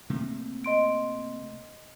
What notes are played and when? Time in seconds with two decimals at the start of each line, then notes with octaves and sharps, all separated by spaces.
0.10 C3 A3 A#3
0.64 D#5 C6 D7